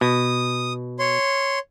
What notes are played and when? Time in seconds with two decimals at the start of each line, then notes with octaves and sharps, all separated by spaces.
0.01 B2 D#6
0.99 C#5 C6